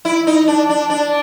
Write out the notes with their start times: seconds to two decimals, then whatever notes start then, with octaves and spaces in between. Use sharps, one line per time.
0.05 E4
0.27 D#4
0.48 D4
0.69 D4
0.90 D4